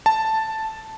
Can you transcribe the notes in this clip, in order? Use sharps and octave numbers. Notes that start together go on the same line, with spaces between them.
A5